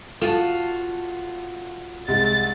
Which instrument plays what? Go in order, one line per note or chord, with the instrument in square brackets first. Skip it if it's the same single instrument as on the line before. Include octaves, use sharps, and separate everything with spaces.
[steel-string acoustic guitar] F4 F#4 [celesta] A4 [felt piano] A5 D#7 E7
[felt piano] C2 G#3 [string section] A6